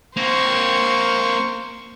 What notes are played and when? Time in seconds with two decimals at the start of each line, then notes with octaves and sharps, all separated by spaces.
0.17 A#3 C4 C5 C#6